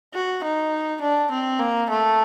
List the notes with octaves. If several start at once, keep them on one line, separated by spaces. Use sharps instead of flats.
F#4
D#4
D4
C4
A#3
A3